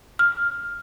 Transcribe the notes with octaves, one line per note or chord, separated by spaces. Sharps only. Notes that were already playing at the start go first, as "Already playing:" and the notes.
F6